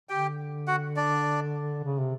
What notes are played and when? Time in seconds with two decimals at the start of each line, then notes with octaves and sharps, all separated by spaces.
0.09 D3 G4 G5
0.67 F#4 F#5
0.97 D4 D5
1.83 C#3
1.98 C3